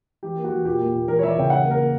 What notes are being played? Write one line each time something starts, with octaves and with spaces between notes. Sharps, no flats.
E3 G4
A#3
F#4
E3
A#2 G4
A#3
A#2
E3 A#4
C#5
E3 E5
D5
C#3 G5
E3 F#5
A#3
A#4
A#3